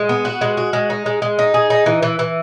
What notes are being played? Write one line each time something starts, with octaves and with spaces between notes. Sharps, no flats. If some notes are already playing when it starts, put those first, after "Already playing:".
Already playing: G#3
B3
F#4
G#3
F#4
G#3
D#4
G#3
G#3
D#4
G#4
D#4
E3
E3
E3